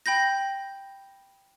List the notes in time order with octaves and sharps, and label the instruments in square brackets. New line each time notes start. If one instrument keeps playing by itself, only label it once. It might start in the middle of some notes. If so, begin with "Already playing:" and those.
[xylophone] G5 B5 G6 A#6